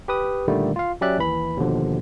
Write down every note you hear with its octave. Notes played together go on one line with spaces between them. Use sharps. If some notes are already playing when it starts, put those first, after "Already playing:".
G4 B4 D#6
A#2 D3 D#3 G3 A3
F4 F5
F#3 C#4 G4 D5 E5 F#6
D#2 E3 B5
D#2 B2 D3 F3